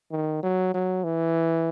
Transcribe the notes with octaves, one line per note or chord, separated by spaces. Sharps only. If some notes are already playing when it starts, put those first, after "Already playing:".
D#3
F#3
F#3
E3